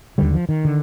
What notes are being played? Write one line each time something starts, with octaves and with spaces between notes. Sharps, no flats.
D#2 D3 G3
F3
D#3
D3